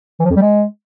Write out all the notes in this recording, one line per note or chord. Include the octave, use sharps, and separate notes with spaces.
E3
F3
F2
G3
G#3